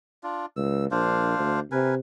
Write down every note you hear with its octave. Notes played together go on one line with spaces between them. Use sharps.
D4 F4
C#2 E6
A#1 D4 C5 F5
D2
C3 A#4 B4 G#5